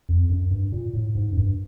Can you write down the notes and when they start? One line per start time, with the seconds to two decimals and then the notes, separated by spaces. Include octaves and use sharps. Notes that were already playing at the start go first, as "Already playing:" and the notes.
0.09 F2
0.30 F#2
0.51 G2
0.72 A#2
0.94 A2
1.15 G#2
1.31 F#2
1.37 G2